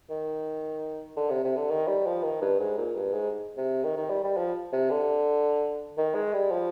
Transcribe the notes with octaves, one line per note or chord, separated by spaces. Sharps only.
D#3
D3
C3
C3
D3
D#3
G3
F3
D#3
G2
G#2
A#2
G2
G#2
C3
D#3
D#3
G3
G3
F3
C3
D3
D#3
G#3
G3
F3